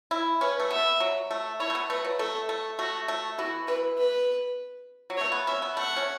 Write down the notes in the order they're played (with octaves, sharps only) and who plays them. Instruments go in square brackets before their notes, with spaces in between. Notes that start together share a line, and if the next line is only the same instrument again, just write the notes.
[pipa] E4
[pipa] C#4 [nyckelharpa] B4
[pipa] A3
[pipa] B3 [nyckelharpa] E5
[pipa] F#3
A3
[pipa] E4 [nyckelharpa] C#5
[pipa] A3
B3
[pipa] A3 [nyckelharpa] B4
[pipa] F#3
[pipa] A3 [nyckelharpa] A4
[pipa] A3
[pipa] A3 [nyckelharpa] F#4
[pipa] A3
[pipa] E3 [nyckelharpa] F#4
[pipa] E3 [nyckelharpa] B4
[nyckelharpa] B4
[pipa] F#3
[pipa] A3 [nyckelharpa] C#5
[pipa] B3
[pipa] C#4 [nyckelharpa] E5
[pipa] B3
[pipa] A3 [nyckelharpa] F#5
[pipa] C#4